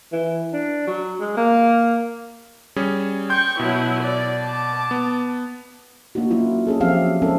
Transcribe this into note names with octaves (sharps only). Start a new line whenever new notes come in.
E3
D4
F#3
G#3
A#3
G3 C#4 G#4
G5 C6 C#6 G6
B2 F#3 E4
D5
A5 D6
B3
A#3 D4 D#4 F#4
F#3 A#3 C#4 E4 F4
C#4 G#4 A4
F3 F#3 C4 G4 E5 F5
G#3 C4 C#4 D#4 A4 A#4